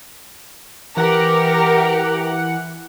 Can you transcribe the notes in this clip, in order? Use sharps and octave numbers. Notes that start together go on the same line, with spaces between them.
E3 G4 A#4 F#5